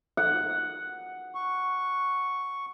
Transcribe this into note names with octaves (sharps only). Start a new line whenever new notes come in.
F#5
C#6